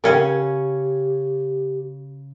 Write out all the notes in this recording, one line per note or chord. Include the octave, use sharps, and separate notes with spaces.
C#3 C#4 G4 A#4 F#5 G5